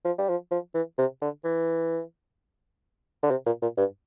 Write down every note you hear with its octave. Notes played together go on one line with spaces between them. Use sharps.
F3
G3
F3
F3
E3
C3
D3
E3
D3
C3
A#2
A#2
G2